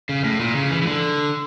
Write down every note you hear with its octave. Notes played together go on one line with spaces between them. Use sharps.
C#3
A2
A#2
C#3
E3
E3
D3